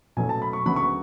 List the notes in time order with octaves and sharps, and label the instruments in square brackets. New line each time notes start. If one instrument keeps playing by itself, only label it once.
[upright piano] B2 F#3 A3 C#4 G#5
A5
B5
C#6
D2 C#3 F#3 B3 B5
C#6